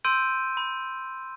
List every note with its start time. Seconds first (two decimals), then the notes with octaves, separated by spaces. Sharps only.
0.04 C6 E6 G6 D7 D#7
0.57 B5